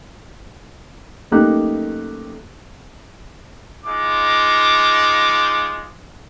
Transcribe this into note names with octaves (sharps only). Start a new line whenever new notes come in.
F#2 A3 A#3 D#4 G4 F#6
G#3 D#4 F4 D6